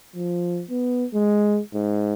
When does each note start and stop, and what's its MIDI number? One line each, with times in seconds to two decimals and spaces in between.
0.15 0.63 53
0.70 1.05 59
1.14 1.60 56
1.74 2.14 44